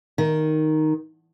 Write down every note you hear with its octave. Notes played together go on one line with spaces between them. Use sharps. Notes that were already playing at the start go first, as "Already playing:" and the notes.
D#3